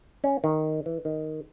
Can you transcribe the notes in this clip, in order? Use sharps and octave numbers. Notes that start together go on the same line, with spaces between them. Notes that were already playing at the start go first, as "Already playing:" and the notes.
C#4
D#3
E3
D#3